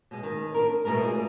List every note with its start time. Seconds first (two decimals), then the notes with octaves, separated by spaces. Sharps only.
0.11 B2 G#3
0.23 D#3
0.54 D4 A#4
0.85 B2 G#3 A3 A#4
1.04 F4 G#4 D5